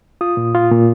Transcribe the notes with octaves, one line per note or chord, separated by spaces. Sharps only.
F4 D#6
A#2
F4
A#2